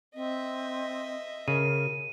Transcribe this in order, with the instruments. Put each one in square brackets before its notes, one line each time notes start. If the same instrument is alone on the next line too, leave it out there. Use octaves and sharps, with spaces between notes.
[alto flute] C4 [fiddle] D#5 E5
[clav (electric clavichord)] C#3 [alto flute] A#4 [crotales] D#7